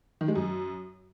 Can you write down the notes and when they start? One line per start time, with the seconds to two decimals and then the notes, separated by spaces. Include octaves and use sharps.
0.21 D#3
0.28 G#3
0.36 F#2